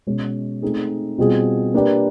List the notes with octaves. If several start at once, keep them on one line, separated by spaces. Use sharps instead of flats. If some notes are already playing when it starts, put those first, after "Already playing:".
B2 G#3 C#4
A3 C4 D#4 G#4
B2 G3 C4 F4 G#4
A#3 D4 G4 B4